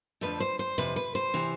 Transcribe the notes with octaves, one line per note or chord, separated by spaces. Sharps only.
F2 D3 F3 A3 B4
C5
C5
F2 C3 E3 B4
B4
C5
C3 E3